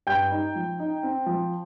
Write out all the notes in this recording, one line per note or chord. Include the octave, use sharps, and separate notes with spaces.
G2 G5 G6
D#4
F3
D#4
C4
F3